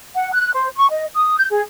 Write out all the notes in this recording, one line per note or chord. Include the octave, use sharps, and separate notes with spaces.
F#5
F#6
C5
C#6
D#5
D#6
G6
G#4